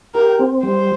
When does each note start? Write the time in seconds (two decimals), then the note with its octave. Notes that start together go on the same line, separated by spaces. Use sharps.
0.14 G4 A#4
0.39 C4
0.63 G3 C5